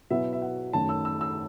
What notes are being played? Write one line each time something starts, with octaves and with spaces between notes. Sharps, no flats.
B2 F#3 B3 E4 E5
E5
F#5
F#2 D#3 A3 C#4 A5
E6
E6
E6